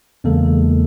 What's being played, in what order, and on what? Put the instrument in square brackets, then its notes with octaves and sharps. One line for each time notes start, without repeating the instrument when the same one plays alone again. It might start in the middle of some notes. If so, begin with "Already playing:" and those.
[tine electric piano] E2 C#3 G#3 A#3 A4